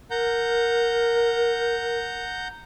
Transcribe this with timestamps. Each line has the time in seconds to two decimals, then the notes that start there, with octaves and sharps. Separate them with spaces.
0.11 A#4 F#5 A#5 G6